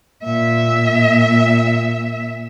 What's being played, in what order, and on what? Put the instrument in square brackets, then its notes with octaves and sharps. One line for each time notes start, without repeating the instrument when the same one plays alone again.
[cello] A#2 E5